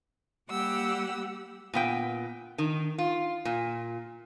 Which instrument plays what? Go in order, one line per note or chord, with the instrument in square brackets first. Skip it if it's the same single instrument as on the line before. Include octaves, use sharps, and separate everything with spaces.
[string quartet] G3 A#3 G4 F#5 E6
[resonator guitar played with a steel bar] A#2 B3 G5
D#3
F4
A#2